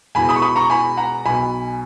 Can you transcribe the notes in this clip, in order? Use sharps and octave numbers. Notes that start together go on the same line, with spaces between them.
E1 E2 B2 G#5 B5
B5 D#6
C#6
B5 D#6
A#5 C#6
G#5 B5
F#5 A#5
B1 B2 G#5 B5